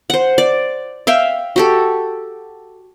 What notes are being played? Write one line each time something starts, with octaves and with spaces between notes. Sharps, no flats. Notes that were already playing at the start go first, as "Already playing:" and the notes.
C5 F#5
D5
E5 F5 G5
F#4 G4 A4